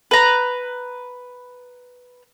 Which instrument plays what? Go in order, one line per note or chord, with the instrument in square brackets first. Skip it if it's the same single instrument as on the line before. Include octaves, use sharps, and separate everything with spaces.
[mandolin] B4 A#5